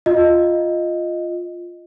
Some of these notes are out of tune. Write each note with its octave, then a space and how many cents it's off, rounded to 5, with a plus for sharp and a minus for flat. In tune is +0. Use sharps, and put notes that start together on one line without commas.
F4 +0 D#5 +0